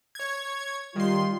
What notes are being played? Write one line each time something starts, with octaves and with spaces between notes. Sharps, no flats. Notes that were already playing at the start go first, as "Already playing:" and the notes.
C#5 G#6
D#3 G3 F4 C6